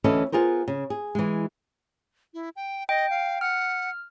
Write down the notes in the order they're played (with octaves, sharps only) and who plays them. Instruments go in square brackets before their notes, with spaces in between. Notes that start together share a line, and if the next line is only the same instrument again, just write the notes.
[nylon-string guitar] D2 E3 C#4 A4 B4 D#5
B3 F4 G#4 A#4 C5
C#3
G#4
E3 G#3
[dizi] E4
G5
[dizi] D#5 [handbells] G5
[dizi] F5
[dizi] F#5 [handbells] F6